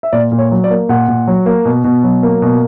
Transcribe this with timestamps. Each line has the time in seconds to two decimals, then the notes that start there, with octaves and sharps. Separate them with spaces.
0.03 E5
0.13 A#2 D5
0.32 A#2
0.39 C#5
0.51 F#3
0.64 D5
0.70 A#3
0.89 A#2 F#5
1.08 A#2
1.27 F#3
1.46 A#3
1.65 B2
1.84 B2
2.04 F#3
2.23 A#3
2.42 B2